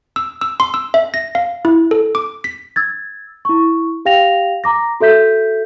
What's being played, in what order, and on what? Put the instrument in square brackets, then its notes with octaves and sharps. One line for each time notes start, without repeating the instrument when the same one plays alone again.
[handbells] E6
E6
C6
E6
E5
A#6
F5
E4
A4
D6
B6
[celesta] E6 G#6 A6
E4 C#6
G4 F5 G5 A#6 F7
A#5 D6 A#6
F#4 A4 E5 G6 B6